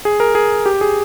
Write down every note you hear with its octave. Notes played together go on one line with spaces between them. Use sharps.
G#4
A#4
G#4
G4
G#4